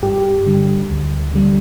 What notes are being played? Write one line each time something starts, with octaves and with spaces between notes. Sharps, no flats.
G2 G4
D3 G3
D2
D3 G3